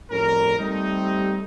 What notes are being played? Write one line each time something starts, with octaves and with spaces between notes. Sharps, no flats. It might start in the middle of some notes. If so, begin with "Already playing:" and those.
F2 A2 G3 C#4 A#4
G3 A3 C4 D#4